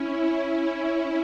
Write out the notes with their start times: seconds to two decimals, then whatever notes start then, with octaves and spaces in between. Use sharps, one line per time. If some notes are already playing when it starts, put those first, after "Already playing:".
Already playing: C#4 E4
0.35 E4